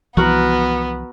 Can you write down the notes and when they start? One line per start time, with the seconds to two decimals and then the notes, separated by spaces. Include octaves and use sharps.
0.17 C2 E3 F3 B3 F#4 A#4 F#5